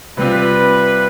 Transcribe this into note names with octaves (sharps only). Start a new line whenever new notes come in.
C3 G3 C4 F4 B4